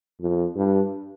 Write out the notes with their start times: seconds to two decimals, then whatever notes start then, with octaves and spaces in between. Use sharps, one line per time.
0.21 F2
0.57 G2